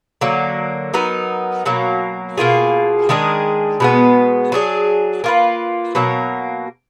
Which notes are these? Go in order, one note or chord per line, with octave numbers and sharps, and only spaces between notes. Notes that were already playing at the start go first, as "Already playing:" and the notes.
D3 F#3 A#3
F#3 B3 D#4 A#4
B2 F#3 A#3
B2 A#3 F4 G#4
D#3 G#3 D4 G#4
B2 G#3 B3
F#3 D4 G#4
A#3 F4 B4
B2 F#3 A#3